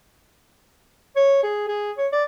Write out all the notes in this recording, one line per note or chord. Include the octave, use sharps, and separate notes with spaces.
C#5
G#4
G#4
C#5
D5